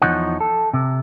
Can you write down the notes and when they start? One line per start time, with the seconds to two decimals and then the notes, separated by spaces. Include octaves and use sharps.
0.02 E2 D#3 F3 D#4 C#5 F#5
0.40 A4
0.73 C3